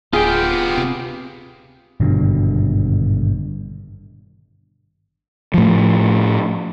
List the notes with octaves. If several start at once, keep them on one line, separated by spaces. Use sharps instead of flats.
D1 B3 F4 G4 G#4 G5
C3
G#1 G2 B2 D3
A2 F3